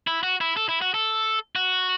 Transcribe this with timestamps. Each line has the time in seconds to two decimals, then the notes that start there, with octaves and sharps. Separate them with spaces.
0.07 E4
0.23 F#4
0.41 E4
0.57 A4
0.69 E4
0.81 F#4
0.94 A4
1.56 F#4